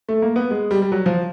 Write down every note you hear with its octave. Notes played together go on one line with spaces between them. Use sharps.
A3
A#3
B3
G#3
G3
G3
F#3
F3